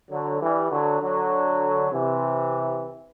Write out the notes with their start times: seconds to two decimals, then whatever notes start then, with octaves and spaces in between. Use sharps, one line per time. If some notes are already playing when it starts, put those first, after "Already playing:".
0.11 D3 F#3
0.41 E3 G3
0.72 D3 F#3
1.01 D3 F#3
1.92 C3 E3